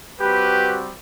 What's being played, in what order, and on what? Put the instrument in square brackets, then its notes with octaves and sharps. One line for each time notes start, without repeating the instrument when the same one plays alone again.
[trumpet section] G3 C4 F#4 G4 B4